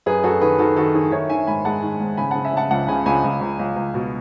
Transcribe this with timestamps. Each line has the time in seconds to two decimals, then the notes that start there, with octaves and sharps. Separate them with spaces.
0.06 F#2 G#4 B4
0.24 F#2 F#4 A4
0.41 D#3 G#4 B4
0.59 D#3 F#4 A4
0.77 D#3 F#4 A4
0.94 D#3 G#4
1.12 D#3 C#5 E5
1.30 D#3 E5 G#5
1.47 G#2 G#5 B5
1.65 G#3 F#5 A5
1.82 D#3
2.00 G#2
2.17 C#3 G#5 B5
2.31 C#3 F#5 A5
2.44 E5 G#5
2.53 C#3 F#5 A5
2.71 C#2 F#5 A5
2.88 C#3 G#5 B5
3.06 C#2 G#5 B5
3.24 C#2
3.41 C#2
3.59 C#2
3.76 C#2
3.94 B2